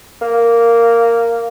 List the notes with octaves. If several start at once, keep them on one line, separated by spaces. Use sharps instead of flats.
A#3